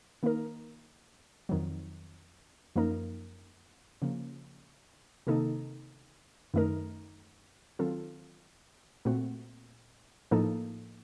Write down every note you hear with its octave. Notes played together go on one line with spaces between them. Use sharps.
D#3 A#3 D#4 A#4
F2 D#3 F#3
F#2 F3 A#3 D#4 A#4
C#3 F3 A#3
C3 D#3 A#3 D#4 A4
F#2 D#3 A3 D#4 A#4
D#3 F#3 C4 F4 A4
A#2 A3 C4 F#4
A2 F3 A#3 D#4 A4